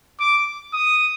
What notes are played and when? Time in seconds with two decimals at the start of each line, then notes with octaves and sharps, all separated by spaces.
0.20 D6
0.74 D#6